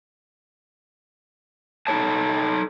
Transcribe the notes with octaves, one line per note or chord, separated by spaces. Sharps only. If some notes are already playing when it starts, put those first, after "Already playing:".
D#4 A4 C#5 A5